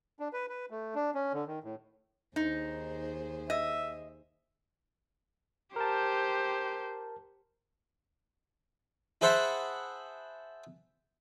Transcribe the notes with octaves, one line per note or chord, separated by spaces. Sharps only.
D4
B4
B4
A3
D4
C#4
D3
D#3
A2
D#2 D#4 G#4 C5
D#5 E5
G4 A#4 C5 A5
E4 G#4 C5 F#5 A5 B5